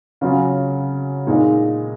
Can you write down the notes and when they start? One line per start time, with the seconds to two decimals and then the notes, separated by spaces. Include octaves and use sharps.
0.21 C#3 F#3 C#4 F4
1.27 A#2 G#3 D#4